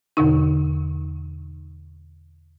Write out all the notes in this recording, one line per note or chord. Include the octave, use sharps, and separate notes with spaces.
E2 B2 D3 D#4